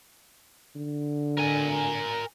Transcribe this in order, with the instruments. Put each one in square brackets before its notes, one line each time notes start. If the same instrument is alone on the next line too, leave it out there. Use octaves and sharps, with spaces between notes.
[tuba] D3
[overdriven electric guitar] A#4 G#5